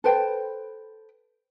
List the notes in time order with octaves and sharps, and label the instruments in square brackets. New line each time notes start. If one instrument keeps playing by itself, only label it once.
[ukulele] A4 B4 C5 G5